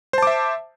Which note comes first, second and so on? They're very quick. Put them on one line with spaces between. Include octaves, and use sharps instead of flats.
C5 A5 D6 E5